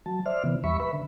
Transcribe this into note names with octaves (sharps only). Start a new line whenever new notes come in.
F#3 A5
C5 D5 E5 F6
C3 E3 B3
E2 G3 E5 B5 C#6
B4 E5 B5
D3